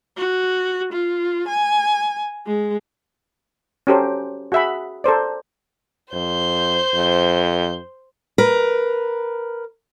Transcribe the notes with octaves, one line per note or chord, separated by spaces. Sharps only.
F#4
F4
G#5
G#3
C#4 F#4 G4 A4 A#4 C5
F#4 G#4 E5 F#5 B5
A4 A#4 C5 D5
F2 C5 G6
F2
A#4 B4